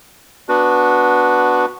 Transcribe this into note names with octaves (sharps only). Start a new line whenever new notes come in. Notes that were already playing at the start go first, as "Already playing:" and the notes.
B3 D4 F#4 B4